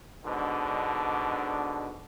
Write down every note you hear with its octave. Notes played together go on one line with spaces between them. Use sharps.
G#2 B2 D3 D4